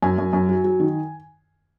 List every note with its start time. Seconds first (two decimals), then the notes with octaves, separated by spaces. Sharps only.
0.02 F#2 G#5
0.18 F#2
0.33 F#2
0.49 F#3
0.64 F#3
0.80 D#3